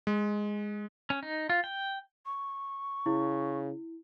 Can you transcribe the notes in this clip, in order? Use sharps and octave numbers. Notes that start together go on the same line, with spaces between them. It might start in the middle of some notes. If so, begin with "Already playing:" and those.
G#3
C#4
D#4
F4
G5
C#6
C#3 E4